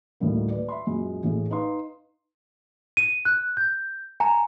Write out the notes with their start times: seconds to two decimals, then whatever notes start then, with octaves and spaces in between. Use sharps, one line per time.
0.20 D2 A2 D#3 G3 A#3
0.50 B4 D5
0.69 E5 B5 C6
0.87 F#2 A#2 G#3
1.22 A1 A2 G#4
1.51 D#4 B4 D#5 F5 C6
2.97 D#7
3.25 F#6
3.57 G6
4.20 G#5 A#5